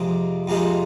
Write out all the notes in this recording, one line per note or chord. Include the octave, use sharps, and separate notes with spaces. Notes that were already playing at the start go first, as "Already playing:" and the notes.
Already playing: F2 C3 F3 G#3 D#4 D6
F2 C3 F3 G#3 D#4